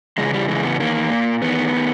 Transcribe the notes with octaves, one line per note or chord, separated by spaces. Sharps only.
E2 C#3 E3 G#3
G3
E2 C#3 E3 G#3
B3
E2 D#3 A#3
A#2
E2 D#3 B3
D#3